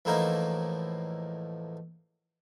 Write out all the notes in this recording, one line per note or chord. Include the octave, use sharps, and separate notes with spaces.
E2 A2 F3 A#3 D#4 E4